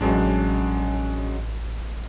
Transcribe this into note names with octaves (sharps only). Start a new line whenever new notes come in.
A1 F3 F#3 G#3 C#4 D4